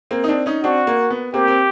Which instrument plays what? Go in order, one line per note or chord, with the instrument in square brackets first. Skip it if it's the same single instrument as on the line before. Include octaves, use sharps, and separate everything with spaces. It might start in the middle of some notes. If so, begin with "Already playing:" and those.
[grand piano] A#3 C4
D#4
C4 D4
C#4 D#4
[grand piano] C4 D4 [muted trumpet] F#4
[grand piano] A#3
B3
[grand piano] A#3 C4 [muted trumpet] G4
[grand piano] C4